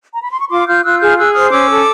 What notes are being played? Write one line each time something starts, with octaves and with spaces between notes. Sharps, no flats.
A#5
B5
C6
C#6
F4 C6 D6
F4 F6 G6
F4 E6 F#6
G#4 F6 G6
G#4 E6 F#6
C5 D#6 F6
C#4 D6 E6
A4